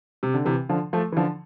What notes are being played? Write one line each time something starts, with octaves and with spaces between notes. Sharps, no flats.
C3
D3
C3 E3
D3 F3
F3 A3
E3
D3 F3